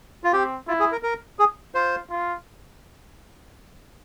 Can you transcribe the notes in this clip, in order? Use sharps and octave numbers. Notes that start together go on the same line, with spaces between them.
F4
C4 G4
E4 F4
G#4
A#4
A#4
G#4
F4 C5
F4